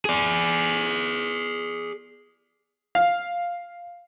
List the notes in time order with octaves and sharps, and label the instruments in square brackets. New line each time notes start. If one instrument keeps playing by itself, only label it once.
[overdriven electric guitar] G#4 D5
[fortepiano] F5